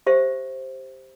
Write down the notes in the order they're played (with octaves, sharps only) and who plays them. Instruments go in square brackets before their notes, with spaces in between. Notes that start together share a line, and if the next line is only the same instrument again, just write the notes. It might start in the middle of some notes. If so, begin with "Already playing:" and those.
[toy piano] G4 C5 E5